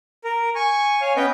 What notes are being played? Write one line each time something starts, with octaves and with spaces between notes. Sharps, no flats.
A#4
G#5 C#6
C#5 F5 G#5
B3 C#4 B4 D#5 G5 G6